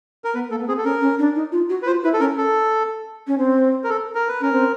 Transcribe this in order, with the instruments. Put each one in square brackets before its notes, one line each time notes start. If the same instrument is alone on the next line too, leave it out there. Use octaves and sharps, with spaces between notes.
[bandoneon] A#4
[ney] B3 [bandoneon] B4
[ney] A#3 [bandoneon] A4
[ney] B3
[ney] C4 [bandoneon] G#4
[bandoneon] A4
[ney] C#4 [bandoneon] A#4
[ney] C#4
D4
D#4
F4
F#4
[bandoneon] B4
[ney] F4 [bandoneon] C5
[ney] E4 [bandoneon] B4
[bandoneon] A4
[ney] C#4 [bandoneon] A#4
[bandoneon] A4
[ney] C#4
C4
[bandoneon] A#4
A4
A#4
B4
[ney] C#4 [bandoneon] A#4
[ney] C4